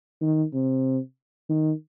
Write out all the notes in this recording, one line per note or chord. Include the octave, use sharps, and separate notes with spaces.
D#3
C3
D#3